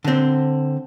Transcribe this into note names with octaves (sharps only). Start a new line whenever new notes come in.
D3 C4